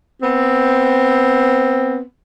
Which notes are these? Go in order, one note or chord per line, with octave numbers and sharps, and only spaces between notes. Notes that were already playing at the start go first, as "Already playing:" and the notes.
B3 C4